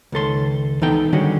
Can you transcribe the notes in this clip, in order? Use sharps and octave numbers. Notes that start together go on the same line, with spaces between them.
C#2 D#3 A4 C6
E3 B3 D#4 A4 G5
D3 D#3 G3 C#4 F#4 G#4